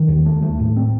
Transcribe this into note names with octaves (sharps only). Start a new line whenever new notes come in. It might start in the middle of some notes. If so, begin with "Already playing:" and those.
Already playing: D#3
D#2
A3
A3
A2
C4